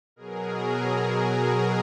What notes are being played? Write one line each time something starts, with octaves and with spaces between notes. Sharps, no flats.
B2 F#3 G#4 A#4